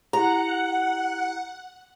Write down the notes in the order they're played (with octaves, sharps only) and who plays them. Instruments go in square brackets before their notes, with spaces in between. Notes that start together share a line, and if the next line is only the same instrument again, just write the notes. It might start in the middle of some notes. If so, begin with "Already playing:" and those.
[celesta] E4 G4 [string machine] F#5 [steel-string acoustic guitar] A#5